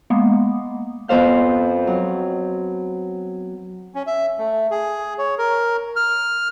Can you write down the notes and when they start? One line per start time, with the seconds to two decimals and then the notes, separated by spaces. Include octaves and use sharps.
0.10 G#3 A#3 B3
1.08 F2 B3 C5 F5 G6
1.87 F#3
3.95 C#4
4.07 E5
4.38 A3
4.71 G#4
5.18 C#5
5.38 A#4
5.96 F6